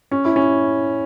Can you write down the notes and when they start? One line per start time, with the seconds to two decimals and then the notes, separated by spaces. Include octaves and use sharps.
0.11 C#4
0.25 E4
0.36 C#4